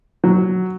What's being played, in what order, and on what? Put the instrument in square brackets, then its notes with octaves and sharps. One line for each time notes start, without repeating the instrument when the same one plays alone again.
[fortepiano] F#3